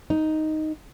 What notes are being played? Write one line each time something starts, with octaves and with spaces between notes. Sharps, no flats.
D#4